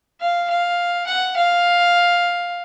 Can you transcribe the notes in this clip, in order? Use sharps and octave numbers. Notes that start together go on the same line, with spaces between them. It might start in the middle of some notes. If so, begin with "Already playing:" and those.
F5
F5
F#5
F5